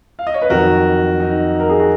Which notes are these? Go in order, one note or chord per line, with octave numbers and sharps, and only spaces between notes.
F5
D#5
C#5
B4
F2 D#3 F#3 F#4 A#4
D#4
A#4
G#4
F#4